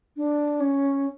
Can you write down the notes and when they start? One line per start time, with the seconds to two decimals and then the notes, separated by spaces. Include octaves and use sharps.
0.17 D4
0.60 C#4